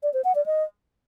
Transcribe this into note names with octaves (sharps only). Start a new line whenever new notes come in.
D5
C5
F#5
D5
D#5